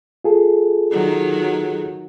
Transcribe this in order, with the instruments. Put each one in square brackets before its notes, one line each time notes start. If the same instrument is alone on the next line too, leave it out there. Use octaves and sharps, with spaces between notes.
[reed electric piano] F4 G#4 A4
[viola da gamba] D#3 F#3